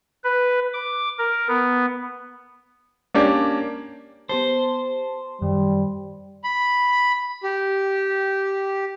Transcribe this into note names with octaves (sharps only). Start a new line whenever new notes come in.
B4
D6
A#4
B3
A#3 C#4 D4 G4
B3 G4 C5 A5
F#2 D#3 G3
B5
G4